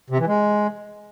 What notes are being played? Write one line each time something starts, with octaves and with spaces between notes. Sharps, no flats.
C3
E3
G#3